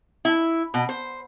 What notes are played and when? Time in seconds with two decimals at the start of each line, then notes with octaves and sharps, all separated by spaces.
0.25 E4
0.74 B2
0.89 C5